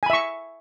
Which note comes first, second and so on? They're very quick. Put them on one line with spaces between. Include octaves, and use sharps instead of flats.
G#5 B5 E5 C#6